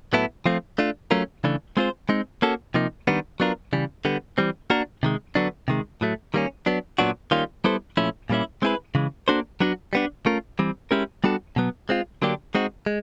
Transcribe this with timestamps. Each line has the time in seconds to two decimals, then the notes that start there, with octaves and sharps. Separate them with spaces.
0.13 A2 F#3 B3 E4 A4
0.46 F3 A3 C4 F4
0.78 A3 D4 F4
1.11 F#3 A3 C#4 F4 A#4
1.44 C#3 E3 A3 D4
1.77 G#3 C4 F4 G#4 C5
2.09 G#3 C4 D#4
2.42 A#3 C#4 F#4 A4
2.74 C3 F3 A#3 D#4
3.07 D#3 G3 B3 D4
3.40 F#3 B3 D4 F4 A#4
3.73 C#3 E3 G3
4.05 D3 G3 B3
4.38 E3 G3 C4
4.70 A#3 D4 F#4 A#4
5.03 C3 D#3 G#3
5.35 D3 F#3 B3 D4
5.68 C3 D#3 G#3
6.01 A2 F#3 A3
6.34 D#3 G3 A#3 C#4
6.66 F#3 B3 D4
6.99 A#2 F#3 B3 D4 F#4
7.31 D#3 G3 A#3 C#4 F4
7.64 G3 B3 E4 A4 C5
7.97 A#2 F3 A3 C#4 E4
8.30 A#2 G3 A#3 C#4 E4
8.62 G#3 C4 E4 G#4 B4
8.95 C#3 E3 G#3
9.28 A#3 D4 F#4 A4 C5
9.60 F#3 B3 D4 F#4
9.93 G3 B3 D4
10.26 A3 C#4 F4 A#4
10.59 E3 G3 C4
10.91 G#3 C#4 E4 G4 A#4
11.24 G3 B3 D4 F#4 A4
11.56 B2 F#3 B3
11.89 G#3 C4 F4
12.22 D3 F#3 A#3 D4 G4
12.55 G#3 C4 D#4 F#4
12.86 G#3